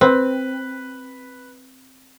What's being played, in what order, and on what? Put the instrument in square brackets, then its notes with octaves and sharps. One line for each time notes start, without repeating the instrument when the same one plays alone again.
[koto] C4 [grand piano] B4